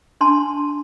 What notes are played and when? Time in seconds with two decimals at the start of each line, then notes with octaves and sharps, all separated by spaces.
0.21 D4 A5 C6